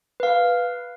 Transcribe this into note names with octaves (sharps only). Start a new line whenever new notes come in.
B4 F5